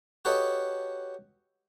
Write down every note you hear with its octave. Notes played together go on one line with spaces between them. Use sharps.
F#4 G4 A4 B4 C#5 D#5